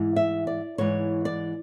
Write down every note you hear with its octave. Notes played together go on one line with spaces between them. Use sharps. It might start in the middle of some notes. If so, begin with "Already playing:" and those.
Already playing: G#2 E3
E5
D5
G#2 E3 C#5
D5